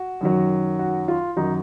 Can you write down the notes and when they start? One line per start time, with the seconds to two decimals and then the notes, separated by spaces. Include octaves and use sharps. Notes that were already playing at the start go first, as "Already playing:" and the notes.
Already playing: F#4
0.21 F#2 D#3 F#3
0.79 F#4
1.08 F4
1.37 F#2 D#3 F#3 D#4